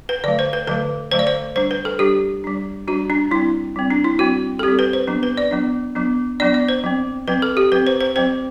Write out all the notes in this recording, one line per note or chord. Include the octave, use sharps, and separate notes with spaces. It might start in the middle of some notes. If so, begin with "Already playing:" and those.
B4
D3 F#3 A3 D5
C5
B4
D3 F#3 A3 B4
D3 F#3 A3 C5
D5
C5
G3 D4 C5
B4
A4
G3 D4 G4
G3 D4
G3 D4 F#4
D4
G3 C4 E4
G3 C4
D4
E4
G3 C4 F#4
A4
G3 C4 G4
B4
C5
F#3 B3 D4
B4
D5
F#3 B3 D4
F#3 B3 D4
F#3 B3 D4 D5
D5
C5
F#3 C4
F#3 C4 B4
A4
G4
F#3 C4 B4
C5
C5
F#3 C4 C5